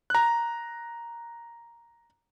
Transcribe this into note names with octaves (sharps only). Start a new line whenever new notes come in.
A#5 F#6